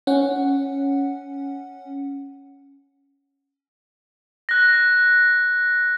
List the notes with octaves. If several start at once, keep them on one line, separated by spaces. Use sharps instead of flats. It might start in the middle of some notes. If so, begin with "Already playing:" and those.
C#4 F#5
F#6 A#6